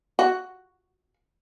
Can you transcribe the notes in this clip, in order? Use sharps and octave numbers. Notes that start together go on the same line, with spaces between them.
F#4